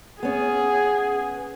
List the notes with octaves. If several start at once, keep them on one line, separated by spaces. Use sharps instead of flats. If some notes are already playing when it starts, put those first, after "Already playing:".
B3 C#4 G#4